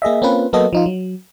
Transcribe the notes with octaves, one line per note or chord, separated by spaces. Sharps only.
A#3 G#4 D#5 E5
A#3 C4 C#4 F4 B4
F#3 A#3 B3 F#4 A4 D#5
F3 D#4 F4
F#3